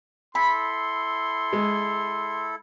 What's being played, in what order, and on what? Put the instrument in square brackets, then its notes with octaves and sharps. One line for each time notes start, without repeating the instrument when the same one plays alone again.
[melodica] E4 A4 [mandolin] B5 [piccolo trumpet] C6
[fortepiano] G#3